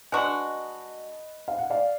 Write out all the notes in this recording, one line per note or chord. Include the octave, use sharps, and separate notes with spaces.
G#3 D4 F#4 B4 D#5
F5
F#5
D5 F5